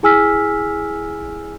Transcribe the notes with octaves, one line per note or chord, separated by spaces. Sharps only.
E4 G#4 G#5 E6 F6 B6